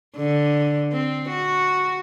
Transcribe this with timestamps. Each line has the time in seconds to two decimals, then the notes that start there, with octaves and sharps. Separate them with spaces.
0.17 D3
0.93 C4
1.30 F#4